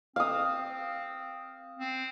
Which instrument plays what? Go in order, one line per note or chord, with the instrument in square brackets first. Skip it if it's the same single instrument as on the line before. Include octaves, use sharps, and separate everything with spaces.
[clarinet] C4 [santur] F5 D#6
[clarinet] C4